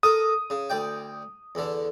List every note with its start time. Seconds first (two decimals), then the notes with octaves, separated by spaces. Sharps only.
0.03 A4 A#4 D#6
0.50 C#3
0.70 D2 D5 G5
1.55 E2 D3